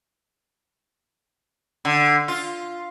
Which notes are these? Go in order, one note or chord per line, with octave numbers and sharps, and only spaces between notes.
D3
F4